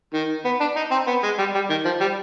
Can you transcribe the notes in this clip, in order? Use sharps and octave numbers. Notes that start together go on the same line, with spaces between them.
D#3
B3
D4
D#4
C4
B3
G#3
G3
G3
D#3
F3
G3